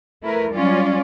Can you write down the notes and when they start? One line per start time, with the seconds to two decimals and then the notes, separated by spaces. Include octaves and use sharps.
0.23 A3 E4 A#4 B4
0.53 F#3 G3 C#4 F4 D5